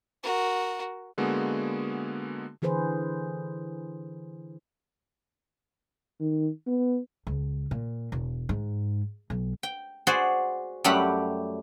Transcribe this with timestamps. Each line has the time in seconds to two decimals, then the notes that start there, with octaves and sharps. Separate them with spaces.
0.23 F#4 A#4
1.18 D3 G#3 A#3 B3 F#4 G#4
2.62 D3 E3 G#4 B4 C5
6.20 D#3
6.67 B3
7.27 C#2
7.71 A#2
8.12 E1
8.49 G#2
9.30 B1
9.63 G5
10.07 F#4 G#4 C5 D5
10.84 F#2 G3 A3 G4 F#5 B5